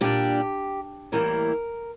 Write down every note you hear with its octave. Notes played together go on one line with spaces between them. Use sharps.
A#2 G3 D4 G4
A2 E3 G3 A#3 E4 A#4